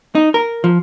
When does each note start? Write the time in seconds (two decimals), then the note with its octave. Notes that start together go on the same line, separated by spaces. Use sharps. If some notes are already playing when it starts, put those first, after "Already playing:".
0.15 D#4
0.34 A#4
0.64 F3